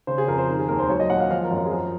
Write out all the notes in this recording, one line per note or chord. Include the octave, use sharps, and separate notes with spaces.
C#3 C5
G#4
F2 A#4
C5
D#3 A#4
G#4
D#2 A#4
C5
F#3 C#5
D#5
A#2 F#5
F5
F3 F5
A#4
F#2
A#4
G#4
F3 A#4